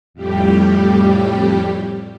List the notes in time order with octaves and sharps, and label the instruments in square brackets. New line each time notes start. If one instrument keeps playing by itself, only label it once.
[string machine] F2 A2 G3 G4